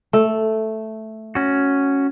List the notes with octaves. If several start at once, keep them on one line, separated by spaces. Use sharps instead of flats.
A3
C#4 F#4